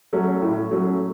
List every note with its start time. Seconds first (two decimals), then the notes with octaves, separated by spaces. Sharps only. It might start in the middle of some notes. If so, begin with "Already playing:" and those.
0.13 F#3 A3 C#4
0.42 A2
0.71 F#3 A3 C#4